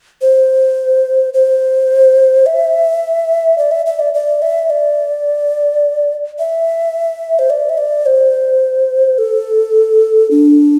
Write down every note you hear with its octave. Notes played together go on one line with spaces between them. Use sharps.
C5
C5
E5
D5
E5
E5
D5
D5
E5
D5
E5
C5
D5
E5
D5
C5
A4
D4